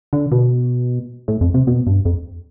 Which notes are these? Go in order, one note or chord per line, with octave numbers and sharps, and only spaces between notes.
D3
B2
A2
F2
C3
B2
G2
F2